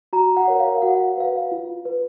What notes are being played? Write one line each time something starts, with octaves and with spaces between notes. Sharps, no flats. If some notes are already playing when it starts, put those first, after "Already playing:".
F#4 A#5
F#5
A#4 C#5
F5
F#4 F#5
F5
B4 F5
F4
B4